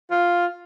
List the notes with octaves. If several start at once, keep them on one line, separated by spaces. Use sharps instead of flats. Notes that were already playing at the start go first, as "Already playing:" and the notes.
F4